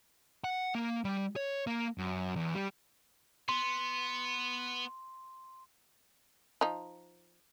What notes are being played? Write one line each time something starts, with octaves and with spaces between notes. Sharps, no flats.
F#5
A#3
G3
C#5
A#3
F#2
E2
G3
B3 C6
F3 D#4